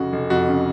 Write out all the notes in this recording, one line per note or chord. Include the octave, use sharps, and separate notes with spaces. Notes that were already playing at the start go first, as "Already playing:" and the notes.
Already playing: F1 C#3 F#4
F1
F2 F#4
C#3